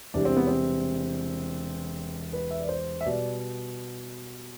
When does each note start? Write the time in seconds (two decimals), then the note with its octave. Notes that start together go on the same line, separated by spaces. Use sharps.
0.14 E1 E2 C3 G3 D4
0.25 C4
0.37 B3
0.47 C4
2.33 B4
2.51 E5
2.60 D5
2.69 C5
3.01 E5
3.06 B2 G3 D5